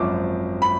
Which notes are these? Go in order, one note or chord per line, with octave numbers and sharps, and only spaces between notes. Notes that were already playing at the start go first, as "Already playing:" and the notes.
Already playing: G#1 F#2 F3 D6
B5